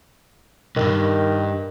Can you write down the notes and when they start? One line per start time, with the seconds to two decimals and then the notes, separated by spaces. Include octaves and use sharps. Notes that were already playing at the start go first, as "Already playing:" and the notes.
0.76 B1 G2 D#3